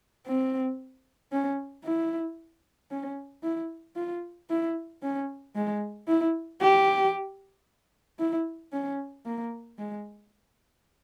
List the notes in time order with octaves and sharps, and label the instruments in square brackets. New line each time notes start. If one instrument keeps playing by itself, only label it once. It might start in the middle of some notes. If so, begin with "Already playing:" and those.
[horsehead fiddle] C4
C#4
E4
C#4
E4
F4
E4
C#4
G#3
E4
G4
E4
C#4
A#3
G#3